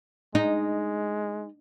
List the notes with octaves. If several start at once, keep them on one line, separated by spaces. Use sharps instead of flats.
G#3 D#4